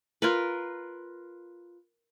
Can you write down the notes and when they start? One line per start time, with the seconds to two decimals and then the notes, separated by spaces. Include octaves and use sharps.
0.22 F4 A#4 B4